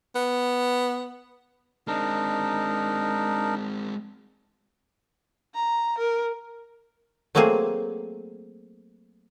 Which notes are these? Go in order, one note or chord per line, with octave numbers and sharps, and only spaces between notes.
B3
G#3 C4 D4 D#4 A#4
A#5
A#4
F#3 A3 A#3 C4 G#4 C5